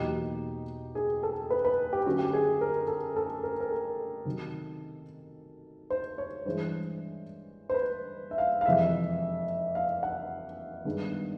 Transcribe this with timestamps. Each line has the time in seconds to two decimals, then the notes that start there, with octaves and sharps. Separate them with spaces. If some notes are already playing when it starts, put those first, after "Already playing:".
Already playing: E2 B2 F#3 A#3 D#4 G4
0.95 G#4
1.23 A4
1.50 B4
1.65 B4
1.93 G4
2.06 D3 F#3 A3 C#4 F#4
2.19 G4
2.33 G#4
2.61 A#4
2.88 A4
3.16 A4
3.43 A#4
3.60 A#4
3.71 A4
4.25 C3 D#3 F#3
5.90 C5
6.18 C#5
6.45 G2 E3 G#3 C5
7.70 C5
7.74 B4
8.31 E5
8.38 F5
8.61 F5
8.65 F2 C3 E3 G#3 E5
9.75 F5
10.03 F#5
10.85 G2 D#3 G#3 B3